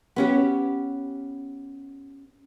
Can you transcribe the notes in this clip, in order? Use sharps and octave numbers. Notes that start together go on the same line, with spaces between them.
B3 C#4 G4